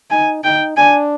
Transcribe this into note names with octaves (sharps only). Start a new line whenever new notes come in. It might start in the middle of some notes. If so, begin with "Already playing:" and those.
D#4 G#5
D#4 G5
D4 G#5